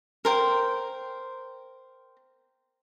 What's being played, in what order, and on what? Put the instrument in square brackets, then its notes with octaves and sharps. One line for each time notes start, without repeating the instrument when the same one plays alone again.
[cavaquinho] A#4 C5 G5